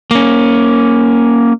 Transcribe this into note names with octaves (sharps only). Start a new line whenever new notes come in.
A#3 C#4